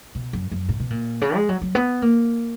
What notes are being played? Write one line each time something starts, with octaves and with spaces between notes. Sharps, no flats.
B2
F#2
F#2
A#2
B2
A#2
C#3
G#3
F#3
F#3
B3
A#3